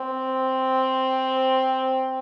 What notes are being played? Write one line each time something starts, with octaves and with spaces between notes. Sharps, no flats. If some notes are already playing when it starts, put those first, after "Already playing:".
Already playing: C4